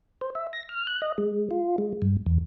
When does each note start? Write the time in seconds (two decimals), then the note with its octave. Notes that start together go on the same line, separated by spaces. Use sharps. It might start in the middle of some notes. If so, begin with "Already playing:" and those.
0.21 C5
0.35 E5
0.53 A#6
0.69 F6
0.87 F#6
1.02 D#5
1.18 G#3
1.51 F4
1.78 G#3
2.02 G2
2.26 E2